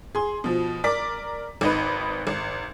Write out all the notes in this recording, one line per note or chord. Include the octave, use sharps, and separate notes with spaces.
G#4 C6
B2 F3
A#4 D5 D6 B6
G#1 D#4 B4
G#1